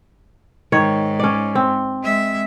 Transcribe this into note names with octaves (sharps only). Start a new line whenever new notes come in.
G#2 D#3 C#5
C#4 D5
C4
G#3 E5